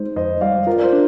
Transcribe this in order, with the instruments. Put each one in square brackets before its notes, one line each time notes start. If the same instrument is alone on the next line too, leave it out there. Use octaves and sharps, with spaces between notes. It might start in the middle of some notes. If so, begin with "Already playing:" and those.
Already playing: [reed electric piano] G#3 D#4 [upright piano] C5
[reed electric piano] F2 [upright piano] C5 D#5
[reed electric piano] G3 [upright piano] D5 F5
[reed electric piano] F4 [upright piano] A#4
[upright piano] D5
C5
[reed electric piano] D4